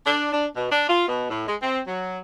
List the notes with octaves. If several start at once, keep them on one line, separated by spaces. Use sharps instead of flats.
D4
D4
B2
D4
F4
B2
A2
G#3
C4
F#3